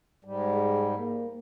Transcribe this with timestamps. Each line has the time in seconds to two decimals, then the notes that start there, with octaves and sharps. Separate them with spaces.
0.25 G#2 G3
0.55 G#4
0.99 A#3